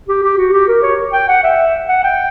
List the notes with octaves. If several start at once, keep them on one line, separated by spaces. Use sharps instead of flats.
G4
G4
F#4
G4
A#4
C#5
G5
F#5
E5
F#5
G5